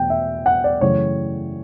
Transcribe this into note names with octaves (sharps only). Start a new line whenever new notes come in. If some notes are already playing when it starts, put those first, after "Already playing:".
Already playing: E2 B2 A3 G5
E5
F#5
D5
F#2 C#3 E3 A3 C#5